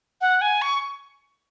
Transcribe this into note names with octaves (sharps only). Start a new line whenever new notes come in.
F#5
G#5
C#6